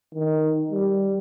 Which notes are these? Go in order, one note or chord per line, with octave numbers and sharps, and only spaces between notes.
D#3
G3